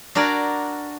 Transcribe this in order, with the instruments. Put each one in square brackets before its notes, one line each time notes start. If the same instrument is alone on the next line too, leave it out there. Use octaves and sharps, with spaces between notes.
[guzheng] D4 F#4 A#4 D5 G#5